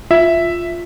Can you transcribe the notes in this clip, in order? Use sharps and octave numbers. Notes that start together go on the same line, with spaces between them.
F4 E5